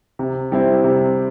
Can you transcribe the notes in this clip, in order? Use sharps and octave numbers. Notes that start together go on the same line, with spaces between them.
C3
G3 C4 E4
C3